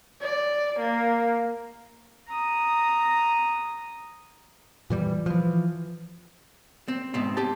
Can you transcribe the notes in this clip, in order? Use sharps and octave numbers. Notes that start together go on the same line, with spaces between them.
D5
A#3
A#5 D#6
A#2 E3 G3
E3 F3
C4
G#2 B2 C4
G4 A5